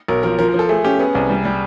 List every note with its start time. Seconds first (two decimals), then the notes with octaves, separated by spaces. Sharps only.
0.08 B1 A#4
0.23 F3 A#4
0.39 F3 A#4
0.49 A#4
0.54 F3 A4
0.69 A3 G#4
0.84 C#4 G4
0.99 B3 G#4
1.15 C2
1.30 G3
1.45 G3